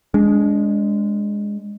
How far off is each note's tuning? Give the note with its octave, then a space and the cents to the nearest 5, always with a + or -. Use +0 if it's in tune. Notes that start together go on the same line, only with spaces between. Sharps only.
G#3 -10 D4 -35